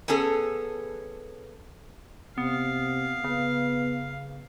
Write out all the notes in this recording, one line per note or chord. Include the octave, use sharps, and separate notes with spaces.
B3 C#4 G#4 A4
C3 B3 F5
C#3 B3